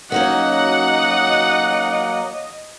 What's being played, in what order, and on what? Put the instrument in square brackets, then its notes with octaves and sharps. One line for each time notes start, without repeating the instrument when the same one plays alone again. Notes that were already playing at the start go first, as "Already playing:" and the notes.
[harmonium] F#3 A#3 [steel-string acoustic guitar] C#4 D#4 F#4 [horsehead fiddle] D#5 [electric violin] F#5